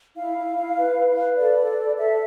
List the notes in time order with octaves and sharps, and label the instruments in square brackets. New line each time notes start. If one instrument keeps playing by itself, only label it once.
[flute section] E4 F5
E4
E4
B4
B4
B4
A4 D5
A4
A4
A4 E5